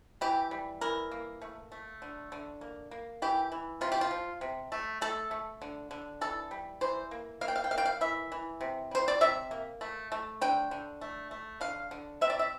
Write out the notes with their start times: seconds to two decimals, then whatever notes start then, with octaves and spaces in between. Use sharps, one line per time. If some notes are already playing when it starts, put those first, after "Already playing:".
0.21 E3 G4
0.51 G3
0.81 E3 A#4
1.11 A#3
1.42 A3
1.72 A3
2.02 D3
2.32 D3
2.61 A#3
2.91 A#3
3.22 E3 G4
3.52 E3
3.81 C3 F4
3.92 G4
4.01 F4
4.11 F3
4.41 C3
4.72 A3
5.01 A3 A4
5.31 A3
5.62 D3
5.91 D3
6.21 E3 A4
6.51 G3
6.81 E3 C5
7.11 A#3
7.41 A#3 F5
7.48 G5
7.56 F5
7.64 G5
7.71 A#3 F5
7.78 G5
7.86 F5
8.01 E3 E5
8.32 E3
8.61 C3
8.91 G3 C5
9.08 D5
9.21 C3 E5
9.51 A#3
9.81 A3
10.12 A3
10.41 D3 G5
10.71 D3
11.01 A3
11.31 A3
11.61 D3 F5
11.91 D3
12.21 C3 E5
12.30 D5
12.39 E5